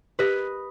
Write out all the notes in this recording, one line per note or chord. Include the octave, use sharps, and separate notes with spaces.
G4 B4 D#5